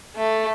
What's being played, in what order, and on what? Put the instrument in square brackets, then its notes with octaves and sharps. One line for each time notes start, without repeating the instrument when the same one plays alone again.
[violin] A3